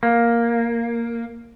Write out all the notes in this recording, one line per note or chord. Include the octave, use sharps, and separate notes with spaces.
A#3